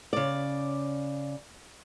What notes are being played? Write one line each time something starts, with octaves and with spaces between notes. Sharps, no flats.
C#3 D5